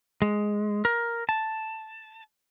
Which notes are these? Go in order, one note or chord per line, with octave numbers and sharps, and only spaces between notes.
G#3
A#4
A5